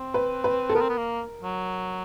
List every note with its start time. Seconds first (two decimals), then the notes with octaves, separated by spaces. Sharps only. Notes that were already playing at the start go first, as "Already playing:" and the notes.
Already playing: C4
0.14 B4
0.44 B4
0.69 A4
0.75 B3 A#4
0.82 C4
0.89 B3
0.97 A#3
1.43 F#3